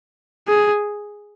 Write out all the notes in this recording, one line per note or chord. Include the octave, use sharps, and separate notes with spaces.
G#4